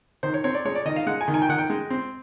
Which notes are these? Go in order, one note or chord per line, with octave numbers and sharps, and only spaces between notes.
D#3 C5
C#5
C4 C#5
D5
G#3 C#5
D5
D#3 D#5
F5
G#3 F#5
G#5
D#3
G#5
G5
D#3 F#5
G5
G#3
C4